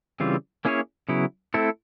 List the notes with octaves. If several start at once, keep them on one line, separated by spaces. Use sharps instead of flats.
C#3 E3 G3 C4 F4
A#3 C#4 E4 G#4 C#5
C#3 F#3 B3 E4
A3 C4 E4 A4